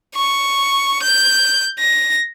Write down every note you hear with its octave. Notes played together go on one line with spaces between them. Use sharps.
C#6
G6
A#6